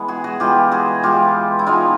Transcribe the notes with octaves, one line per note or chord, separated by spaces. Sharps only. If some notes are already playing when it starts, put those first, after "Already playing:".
Already playing: E3 G#3 B3
F#4 G#4
F#4 G#4
E3 G#3 B3 F4 G4
F#4 G#4
E3 G#3 B3 F4 G4
E4
E3 G#3 B3 D#4 F4